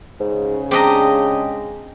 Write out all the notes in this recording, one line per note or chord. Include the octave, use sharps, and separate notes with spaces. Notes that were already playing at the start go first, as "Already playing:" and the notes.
G#2 C#3
G#3 C4 D4 G4 D#5 A#5